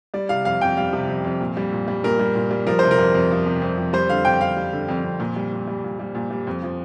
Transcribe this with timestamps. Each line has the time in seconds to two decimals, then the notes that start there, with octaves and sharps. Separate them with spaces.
0.14 G3 D5
0.29 C3 F5
0.45 F2 F5
0.61 F2 G5
0.77 G3 F5
0.93 C3
1.09 F2
1.24 F2
1.40 A#2
1.57 G3
1.72 A#2
1.88 G3
2.04 A#2 A#4
2.19 G3
2.35 A#2
2.51 G3
2.67 F3 A#4
2.79 C3 C5
2.91 A#4
2.98 F2
3.15 F2
3.30 F3
3.46 C3
3.62 F2
3.78 F2
3.93 G3 C5
4.09 D3 F5
4.25 F2 G5
4.41 F2 F5
4.57 G3
4.73 D3
4.88 F2
5.04 F2
5.20 A#2
5.36 G3
5.52 A#2
5.68 G3
5.84 A#2
5.99 G3
6.15 A#2
6.31 G3
6.47 F2
6.63 F3